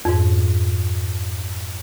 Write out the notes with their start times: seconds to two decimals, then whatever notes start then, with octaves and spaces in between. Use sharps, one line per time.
0.05 F2 G#2